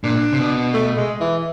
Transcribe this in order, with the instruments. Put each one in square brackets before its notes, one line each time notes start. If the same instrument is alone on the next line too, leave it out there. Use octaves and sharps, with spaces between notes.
[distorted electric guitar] A#2 [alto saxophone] D4
[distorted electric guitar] C3
B2
[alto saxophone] A3
G#3
E3